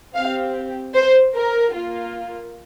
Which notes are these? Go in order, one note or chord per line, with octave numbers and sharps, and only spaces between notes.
C4 G4 F5
C5
A#4
A#3 F4